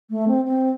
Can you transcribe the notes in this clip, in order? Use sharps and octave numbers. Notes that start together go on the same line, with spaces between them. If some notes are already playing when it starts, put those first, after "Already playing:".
A3
C4
C4